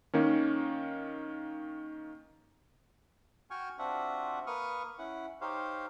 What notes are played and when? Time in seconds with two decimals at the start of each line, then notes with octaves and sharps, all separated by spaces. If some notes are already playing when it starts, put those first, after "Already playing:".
0.14 D#3 A#3 C#4
3.51 F#4 G5 G#5 C#6 F6
3.79 C4 D4 F4 F#4 E5 F#5
4.47 A#3 B4 C#6 D#6 F6
4.98 C#4 E4 F#5
5.41 D#4 G4 C5 C#5 F5